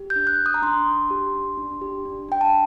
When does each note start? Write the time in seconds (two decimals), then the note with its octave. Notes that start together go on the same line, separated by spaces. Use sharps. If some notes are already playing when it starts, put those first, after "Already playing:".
Already playing: G4
0.10 G6
0.16 D4
0.27 F#6
0.39 D4
0.46 D#6
0.54 A#5
0.62 D4 C6
0.87 D4
1.10 G4
1.34 D4
1.57 D4
1.81 G4
2.05 D4
2.29 D4 G5
2.41 A5